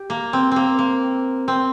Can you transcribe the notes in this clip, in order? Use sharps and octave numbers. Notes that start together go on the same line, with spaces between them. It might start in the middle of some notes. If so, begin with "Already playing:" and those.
Already playing: G4
A#3
C4
A#3 C4
A#3
C4